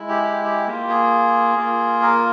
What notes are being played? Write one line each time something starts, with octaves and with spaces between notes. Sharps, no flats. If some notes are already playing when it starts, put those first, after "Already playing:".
Already playing: G#3 E4
G4
G4
G4
A#3 F4 G4
G#4
A#3 F4
A#4